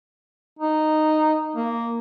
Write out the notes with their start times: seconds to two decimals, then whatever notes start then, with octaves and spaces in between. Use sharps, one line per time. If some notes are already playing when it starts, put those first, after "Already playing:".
0.59 D#4
1.56 A#3